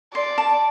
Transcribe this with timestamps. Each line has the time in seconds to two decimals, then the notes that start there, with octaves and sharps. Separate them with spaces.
0.14 D5 C6
0.38 A5